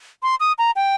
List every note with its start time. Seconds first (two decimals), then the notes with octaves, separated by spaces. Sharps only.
0.23 C6
0.40 D#6
0.58 A#5
0.76 G5